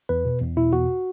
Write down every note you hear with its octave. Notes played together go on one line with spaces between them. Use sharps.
E2 B4
B2
E2
B2 E4
E2 F#4